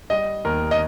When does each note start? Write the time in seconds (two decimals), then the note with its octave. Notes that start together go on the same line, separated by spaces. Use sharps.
0.10 G3 D#5
0.45 D#2 A#4
0.71 D#5